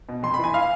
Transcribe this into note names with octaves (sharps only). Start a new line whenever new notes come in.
B2
F2 C6
B5
E3 G#5
F5